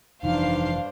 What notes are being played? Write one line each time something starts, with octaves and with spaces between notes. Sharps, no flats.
F1 G2 E3 F3 D4 D#4 C5 F5